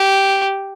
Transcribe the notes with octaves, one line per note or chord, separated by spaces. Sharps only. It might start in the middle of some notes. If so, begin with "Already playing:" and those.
Already playing: G4